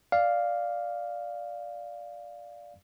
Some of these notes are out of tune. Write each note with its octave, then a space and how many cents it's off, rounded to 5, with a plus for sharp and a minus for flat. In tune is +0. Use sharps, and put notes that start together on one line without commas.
D5 +0 F5 +0